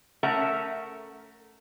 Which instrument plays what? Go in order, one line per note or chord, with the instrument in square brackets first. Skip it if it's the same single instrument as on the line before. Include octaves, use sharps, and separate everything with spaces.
[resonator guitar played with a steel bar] A3 C#4 A#4 E5 F#5 A#5